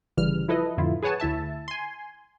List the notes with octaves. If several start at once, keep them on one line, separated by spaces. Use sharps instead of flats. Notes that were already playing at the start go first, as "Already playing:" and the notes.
G1 C#3 E3 G3 F6
F3 E4 A4 B4 D#5
F2 A2 D3 E4 F4
G#4 B4 C#5 F#5 G#5 A5
D2 E4 E5 A5
G#5 C6